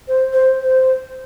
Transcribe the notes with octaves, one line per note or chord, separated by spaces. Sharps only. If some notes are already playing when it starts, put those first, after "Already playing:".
C5
C5
C5